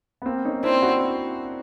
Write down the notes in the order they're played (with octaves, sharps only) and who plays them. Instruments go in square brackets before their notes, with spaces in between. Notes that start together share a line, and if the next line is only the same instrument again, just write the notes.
[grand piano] B3
A#3 C4
C#4 D#4
[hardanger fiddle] C4 [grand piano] D4 E4
[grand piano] E4 F#4